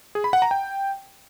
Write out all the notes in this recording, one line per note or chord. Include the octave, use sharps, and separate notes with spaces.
G#4
B5
F#5
A#5
G5